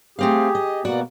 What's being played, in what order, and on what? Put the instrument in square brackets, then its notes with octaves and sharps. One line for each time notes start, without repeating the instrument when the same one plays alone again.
[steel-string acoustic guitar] A3 C4 F5 [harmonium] G4 G#4
[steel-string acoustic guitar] D#5
[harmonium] B2 A#3 B3 [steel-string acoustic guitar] F#4 D5